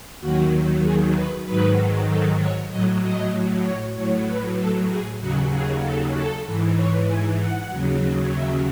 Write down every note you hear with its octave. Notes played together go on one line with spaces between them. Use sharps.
D#2 D#3 F#3 F#4
G#4
B4
G#2 D#3 F#3 B4
A4
C#5
A2 F#3 D#5
D#5
C#5
A2 F#3 C#5
B4
A4
G#4
D#2 C#3 F#3 F#4
G#4
A4
A4
G#2 E3
C#5
G#5
F#5
D#2 C#3 F#3
E5